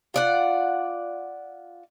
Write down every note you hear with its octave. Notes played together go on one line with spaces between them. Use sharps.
F4 D5 F#5